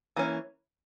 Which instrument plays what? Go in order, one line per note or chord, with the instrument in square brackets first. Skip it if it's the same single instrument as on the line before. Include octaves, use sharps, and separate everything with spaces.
[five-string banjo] E3 A#3 C#4